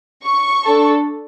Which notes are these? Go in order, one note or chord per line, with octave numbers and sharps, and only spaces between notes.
C#6
D4 A4